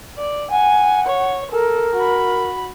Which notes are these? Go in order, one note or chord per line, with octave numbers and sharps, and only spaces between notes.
D5
F#5 G#5
C#5
A4 A#4
F#4 B5